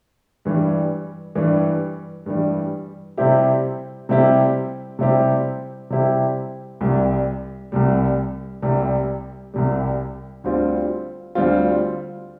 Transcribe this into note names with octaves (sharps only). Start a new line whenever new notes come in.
G2 E3 G3
G2 E3 G3
G2 E3 G3
C3 G3 C4 E4 G4
C3 G3 C4 E4 G4
C3 G3 C4 E4 G4
C3 G3 C4 E4 G4
C2 C3 G3
C2 C3 G3
C2 C3 G3
C2 C3 G3
D2 D3 G3 C4 F4
D2 D3 G3 C4 F4